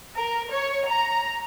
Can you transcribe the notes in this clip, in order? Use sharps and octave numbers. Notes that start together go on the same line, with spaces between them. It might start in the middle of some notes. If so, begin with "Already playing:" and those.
A#4
C#5
A#5